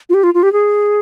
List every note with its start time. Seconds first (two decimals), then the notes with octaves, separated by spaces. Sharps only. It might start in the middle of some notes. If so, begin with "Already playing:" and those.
0.09 F4
0.14 G4
0.23 F4
0.34 F4
0.43 G4
0.53 G#4